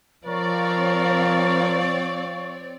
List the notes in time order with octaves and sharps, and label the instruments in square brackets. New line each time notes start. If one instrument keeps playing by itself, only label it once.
[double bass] F3 [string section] C4 C#5 D5 [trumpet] A#4 [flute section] F5 C#6